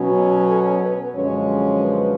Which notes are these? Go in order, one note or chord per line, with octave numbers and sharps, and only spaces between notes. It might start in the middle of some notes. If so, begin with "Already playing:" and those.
Already playing: B2 F#3 C#4
A4
B4
F#2 D3 F3 G#3 C#4 C#5
B4